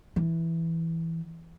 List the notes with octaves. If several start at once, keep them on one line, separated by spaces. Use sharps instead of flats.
E3